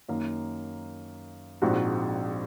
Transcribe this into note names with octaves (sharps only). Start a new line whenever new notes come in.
F#2 D#3 A#3
A#1 G#2 F3 C4 F#4